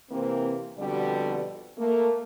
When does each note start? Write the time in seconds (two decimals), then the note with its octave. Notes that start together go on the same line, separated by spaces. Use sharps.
0.10 C3 E3 A#3 C4
0.78 F2 B2 D3 G3 D5
1.77 A3 A#3